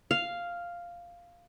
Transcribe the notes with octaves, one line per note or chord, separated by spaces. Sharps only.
F5